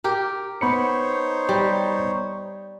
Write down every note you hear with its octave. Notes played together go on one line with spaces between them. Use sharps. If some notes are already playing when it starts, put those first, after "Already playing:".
G4 A#4
B3 D#4 C5 C#5 B5 C#7
G3